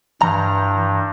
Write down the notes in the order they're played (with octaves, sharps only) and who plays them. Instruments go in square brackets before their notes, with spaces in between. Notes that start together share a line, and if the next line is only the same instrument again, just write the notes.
[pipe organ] G2 [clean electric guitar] E3 A#5